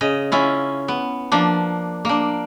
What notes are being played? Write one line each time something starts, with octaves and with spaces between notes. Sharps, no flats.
C#3 D#5
C#4 E4 F4
B3
F3 A#3 D4
A#3 D4